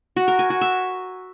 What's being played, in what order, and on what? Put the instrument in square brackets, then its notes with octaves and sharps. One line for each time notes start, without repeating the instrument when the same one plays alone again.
[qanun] F#4
A#4
G#5
F#4
E5